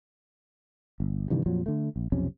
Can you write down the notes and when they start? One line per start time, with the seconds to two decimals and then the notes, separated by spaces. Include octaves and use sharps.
1.00 G1
1.30 G2 C3 D#3 E3
1.46 F2 A#2 F3 F#3
1.66 D3 A3
1.96 A#1
2.12 B1 F2 C3 C#4